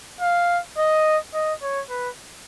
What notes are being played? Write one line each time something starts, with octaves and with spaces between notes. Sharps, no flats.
F5
D#5
D#5
C#5
B4